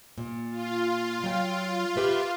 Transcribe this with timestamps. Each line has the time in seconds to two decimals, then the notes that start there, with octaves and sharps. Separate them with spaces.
0.18 A#2
0.51 F4
1.23 F#3 G5
1.96 G4 B4 E5